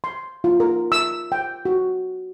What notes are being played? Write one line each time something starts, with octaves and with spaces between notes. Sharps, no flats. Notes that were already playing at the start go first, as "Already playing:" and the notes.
C6
F4
A#4
E6
G5
F#4